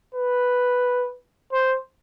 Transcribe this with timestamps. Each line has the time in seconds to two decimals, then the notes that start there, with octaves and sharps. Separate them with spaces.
0.15 B4
1.52 C5